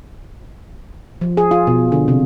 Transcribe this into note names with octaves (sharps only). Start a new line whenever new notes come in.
F3
G#4
F4
B2
D3
C3